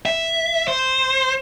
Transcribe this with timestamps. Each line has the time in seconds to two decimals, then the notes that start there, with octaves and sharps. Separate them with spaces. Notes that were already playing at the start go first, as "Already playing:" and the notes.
0.06 E5
0.68 C5